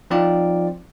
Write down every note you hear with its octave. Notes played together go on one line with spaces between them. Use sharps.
F3 C4 D#4 F4 D5